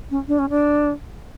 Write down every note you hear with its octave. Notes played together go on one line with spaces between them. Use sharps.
C#4
D4
C#4
D4